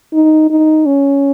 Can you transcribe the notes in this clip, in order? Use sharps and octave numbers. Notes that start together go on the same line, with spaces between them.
D#4
D#4
C#4